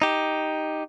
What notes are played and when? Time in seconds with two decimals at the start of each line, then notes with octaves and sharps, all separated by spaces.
0.02 D#4 G4